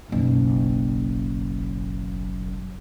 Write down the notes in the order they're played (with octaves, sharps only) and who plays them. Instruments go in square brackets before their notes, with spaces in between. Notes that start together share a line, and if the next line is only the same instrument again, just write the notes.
[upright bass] F#1 B1